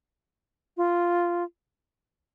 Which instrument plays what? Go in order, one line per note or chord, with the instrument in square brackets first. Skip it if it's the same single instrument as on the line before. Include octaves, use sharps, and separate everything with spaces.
[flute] F4